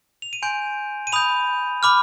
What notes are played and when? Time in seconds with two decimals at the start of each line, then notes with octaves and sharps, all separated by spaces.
0.22 F7
0.33 D#7
0.42 G#5 C6 G6 D7
1.07 D#7
1.12 B5 D#6 G6 F7
1.83 B5 D6 F6